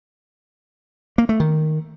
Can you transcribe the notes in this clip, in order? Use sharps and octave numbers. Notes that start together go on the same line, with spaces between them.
A#3
A3
D#3